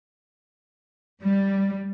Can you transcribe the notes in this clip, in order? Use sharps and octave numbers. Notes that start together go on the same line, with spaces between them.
G3